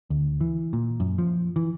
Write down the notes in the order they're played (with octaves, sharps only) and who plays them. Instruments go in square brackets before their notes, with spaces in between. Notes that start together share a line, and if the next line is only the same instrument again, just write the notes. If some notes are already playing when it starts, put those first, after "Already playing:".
[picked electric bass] D2
E3
A#2
F#2
F3
E3